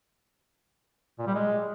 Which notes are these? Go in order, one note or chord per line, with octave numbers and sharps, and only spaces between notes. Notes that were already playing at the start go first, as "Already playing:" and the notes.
A#2
G3
G#3